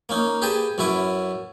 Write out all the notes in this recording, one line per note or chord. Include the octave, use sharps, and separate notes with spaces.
A#3 C#4 D#4
G4 G#4 B4 G5 A5
F#2 C#4 E4 B4 D6